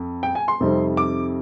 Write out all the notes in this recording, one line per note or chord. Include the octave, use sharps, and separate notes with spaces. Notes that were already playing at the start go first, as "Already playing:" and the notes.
Already playing: F2
G5
G#5
C6
F2 C3 G3 C4 D#4
D6